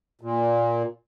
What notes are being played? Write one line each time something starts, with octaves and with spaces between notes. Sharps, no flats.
A#2